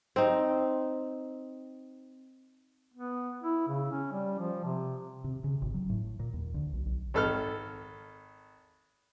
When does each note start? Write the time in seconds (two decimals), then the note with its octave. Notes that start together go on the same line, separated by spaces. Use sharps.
0.16 C4 D#4
2.94 B3
3.43 E4
3.68 C#3
3.91 C#4
4.12 G3
4.39 F3
4.65 C3
5.24 C3
5.44 C#3
5.62 G#1
5.74 F#3
5.90 A2
6.20 A#2
6.33 D#2
6.54 D2
6.73 B1
6.86 B1
7.14 G#1 A4 F6